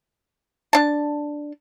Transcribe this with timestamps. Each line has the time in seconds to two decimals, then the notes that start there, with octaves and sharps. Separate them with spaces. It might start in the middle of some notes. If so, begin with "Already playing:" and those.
0.73 D4 A5